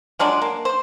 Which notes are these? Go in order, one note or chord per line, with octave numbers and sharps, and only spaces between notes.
F3 F#3 G#3 D4
A#3
C5